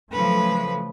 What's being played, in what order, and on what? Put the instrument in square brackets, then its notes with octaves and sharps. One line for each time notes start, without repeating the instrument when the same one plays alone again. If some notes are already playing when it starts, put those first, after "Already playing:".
[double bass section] C#3 F#3 A3 [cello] F3 B4